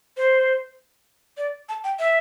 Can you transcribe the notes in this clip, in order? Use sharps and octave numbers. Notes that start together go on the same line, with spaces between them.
C5
D5
A5
G5
E5